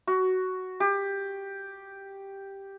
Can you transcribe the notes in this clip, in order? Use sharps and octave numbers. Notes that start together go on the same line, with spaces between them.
F#4
G4